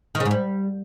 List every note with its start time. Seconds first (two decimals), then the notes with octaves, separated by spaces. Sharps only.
0.15 D#3
0.20 C#3
0.25 G#2
0.31 G3